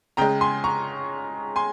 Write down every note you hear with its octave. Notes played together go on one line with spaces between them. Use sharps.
C#3 G#3 G5 A#5
G#5 C6
A#5 C#6
G#5 C6